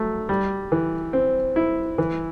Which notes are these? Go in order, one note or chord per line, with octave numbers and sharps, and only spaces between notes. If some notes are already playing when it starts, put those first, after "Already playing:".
Already playing: F#3 A3
G3
E3
C4
E4
E3